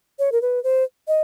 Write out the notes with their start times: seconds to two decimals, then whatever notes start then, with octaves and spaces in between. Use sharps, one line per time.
0.19 C#5
0.32 A#4
0.42 B4
0.64 C5
1.08 D#5